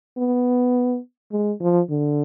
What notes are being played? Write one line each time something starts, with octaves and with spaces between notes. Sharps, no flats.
B3
G#3
F3
D3